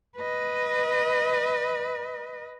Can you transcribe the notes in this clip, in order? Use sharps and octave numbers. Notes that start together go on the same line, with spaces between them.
B4 D#5